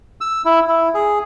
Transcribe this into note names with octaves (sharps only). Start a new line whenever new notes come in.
E6
E4
E4
G#4